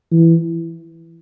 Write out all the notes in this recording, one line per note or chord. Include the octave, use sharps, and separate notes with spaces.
E3